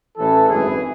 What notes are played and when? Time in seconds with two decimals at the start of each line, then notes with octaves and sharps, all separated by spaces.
0.17 A1 A2 E3 A4
0.49 G#1 F#2 E3 G#4